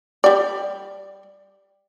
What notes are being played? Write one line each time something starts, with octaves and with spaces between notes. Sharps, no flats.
G3 D5